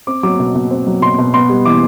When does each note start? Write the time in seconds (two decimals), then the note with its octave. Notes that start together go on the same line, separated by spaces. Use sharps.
0.07 C4 D6
0.23 F#3 D6
0.39 B2
0.55 B2
0.71 C4
0.87 F#3
1.02 B2 C6
1.18 B2
1.34 B3 C6
1.49 G3
1.65 E3 D6